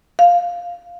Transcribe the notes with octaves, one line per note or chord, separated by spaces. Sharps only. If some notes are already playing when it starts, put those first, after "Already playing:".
F5